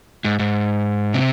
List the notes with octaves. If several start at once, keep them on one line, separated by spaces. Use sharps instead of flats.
G#2
G#2
C3